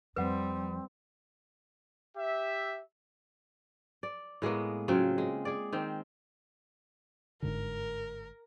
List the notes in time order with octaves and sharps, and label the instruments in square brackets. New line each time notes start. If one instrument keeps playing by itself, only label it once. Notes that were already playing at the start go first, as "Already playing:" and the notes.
[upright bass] F2 F3 [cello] G3 [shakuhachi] C4 [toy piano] B4 F#5
[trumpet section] G4 E5
[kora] D5
A2 G#3 A#3 B3
C#3 F#3 C4 F4
G#3
G#4 D5
D#3 C4
[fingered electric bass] G1 G#2 D3 [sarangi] A#4